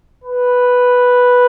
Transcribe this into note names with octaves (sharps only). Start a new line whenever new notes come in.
B4